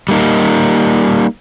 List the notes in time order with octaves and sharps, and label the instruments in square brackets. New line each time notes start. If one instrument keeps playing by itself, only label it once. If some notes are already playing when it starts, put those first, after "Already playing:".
[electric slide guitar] G3 A#3 D#4